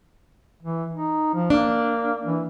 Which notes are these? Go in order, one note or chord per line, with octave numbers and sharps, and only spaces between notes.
E3
D#4
F3
A#3 D4
E3